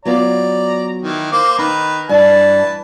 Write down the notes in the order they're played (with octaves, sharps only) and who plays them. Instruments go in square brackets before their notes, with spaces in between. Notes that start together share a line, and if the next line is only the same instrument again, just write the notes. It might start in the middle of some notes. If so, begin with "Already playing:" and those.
[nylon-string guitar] F#3 B3 F4 [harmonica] D5 A#5
[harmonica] D#3 E3
A#3 C5 D6
[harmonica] D#3 B4 A#5 [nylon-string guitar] D#4
[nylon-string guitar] G2 [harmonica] E3 B4 A5